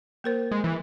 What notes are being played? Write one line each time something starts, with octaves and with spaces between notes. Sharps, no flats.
A#3 A#4 C5
G#3
E3